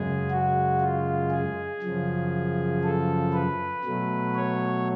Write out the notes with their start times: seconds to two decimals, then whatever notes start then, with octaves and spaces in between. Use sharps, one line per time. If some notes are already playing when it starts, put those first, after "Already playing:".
Already playing: F#2 C#3 G#3 G#4
0.31 F#4
0.81 F4
1.31 G#4
1.82 F#2 C#3 F3
2.84 A4
3.34 B4
3.84 B2 F#3 A3
4.35 C#5